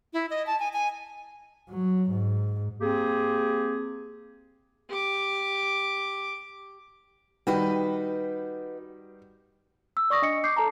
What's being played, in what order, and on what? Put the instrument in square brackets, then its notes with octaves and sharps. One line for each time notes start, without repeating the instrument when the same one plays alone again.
[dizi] E4
D#5
A5
G#5
G#5
[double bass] F#3
G#2
[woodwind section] A#3 C4 G4 G#4
[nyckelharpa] G4 D6
[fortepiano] D#3 G3 [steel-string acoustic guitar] F#4 B4 D#5
[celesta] E6
D5 C#6 D#6 A#6
D4 D#5 C#7
D6 G6 C7
A4 A5 A#5